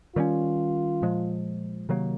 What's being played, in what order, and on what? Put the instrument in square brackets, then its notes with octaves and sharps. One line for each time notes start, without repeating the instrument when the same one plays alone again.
[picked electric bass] D#3 G3 A#3 C#4 [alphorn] F4
[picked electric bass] A#2 F3 G#3
C3 D#3 F#3 A#3